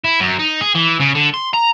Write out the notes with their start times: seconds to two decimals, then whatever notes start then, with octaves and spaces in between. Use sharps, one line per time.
0.04 E4
0.20 F#2
0.39 D#4
0.61 G#4
0.75 E3
1.00 C#3
1.15 D3
1.34 C6
1.53 A#5